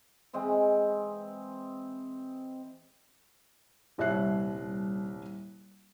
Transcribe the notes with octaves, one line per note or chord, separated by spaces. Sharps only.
E3 G#3 C4
D#1 C2 C#5 E5 F#6 C7